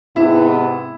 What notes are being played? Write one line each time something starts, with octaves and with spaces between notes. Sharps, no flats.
G#2 C3 B3 E4